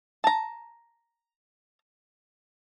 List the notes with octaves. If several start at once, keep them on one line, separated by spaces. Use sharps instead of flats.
A5 A#5